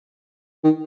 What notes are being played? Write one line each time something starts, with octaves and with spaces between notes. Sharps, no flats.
D#3